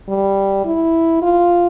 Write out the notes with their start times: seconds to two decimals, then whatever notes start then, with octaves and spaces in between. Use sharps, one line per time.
0.08 G3
0.65 E4
1.22 F4